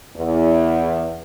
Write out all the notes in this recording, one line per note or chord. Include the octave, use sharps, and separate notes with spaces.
E2